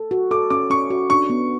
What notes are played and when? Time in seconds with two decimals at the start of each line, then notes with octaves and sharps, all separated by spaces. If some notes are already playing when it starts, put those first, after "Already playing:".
Already playing: A4
0.11 F#4
0.31 A4 D6
0.50 C#4 D6
0.70 C#4 C#6
0.90 F#4
1.10 D4 C#6
1.30 B3